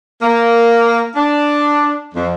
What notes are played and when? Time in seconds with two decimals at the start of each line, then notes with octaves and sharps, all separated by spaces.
0.22 A#3
1.16 D4
2.14 F2